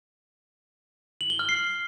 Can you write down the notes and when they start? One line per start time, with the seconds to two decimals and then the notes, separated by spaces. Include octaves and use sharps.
1.21 F#7
1.30 G7
1.39 F6
1.49 C7